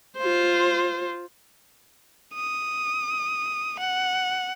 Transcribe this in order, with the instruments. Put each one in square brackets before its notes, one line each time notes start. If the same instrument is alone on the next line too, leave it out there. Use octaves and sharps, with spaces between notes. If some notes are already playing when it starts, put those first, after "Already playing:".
[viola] F4 C5
[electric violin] D#6
F#5